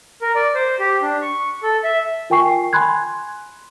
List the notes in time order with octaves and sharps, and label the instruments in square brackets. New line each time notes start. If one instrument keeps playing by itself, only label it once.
[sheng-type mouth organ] A#4
D5
C5
G4
D4
C#6
A4
E5
[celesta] F4 A#4 G5 G#5 C#6 C7
G#5 B5 C6 F#6 G#6